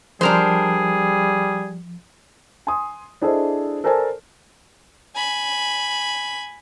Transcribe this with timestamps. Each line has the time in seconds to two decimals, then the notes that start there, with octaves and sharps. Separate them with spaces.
0.21 F3 G3 D4 G#4 A#4 C5
2.67 G#5 C6 D#6
3.21 D4 E4 G#4 A4 C5 D#5
3.84 A4 A#4 C5 D5 G#5 A5
5.15 G#5 B5